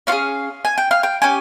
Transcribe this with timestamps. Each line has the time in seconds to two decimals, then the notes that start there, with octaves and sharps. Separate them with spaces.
0.07 C#4 F4 F5
0.12 G#4
0.65 G#5
0.78 G5
0.91 F5
1.03 G5
1.22 C#4 G4 G#5